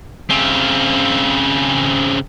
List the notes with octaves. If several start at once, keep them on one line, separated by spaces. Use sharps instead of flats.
C#3 C4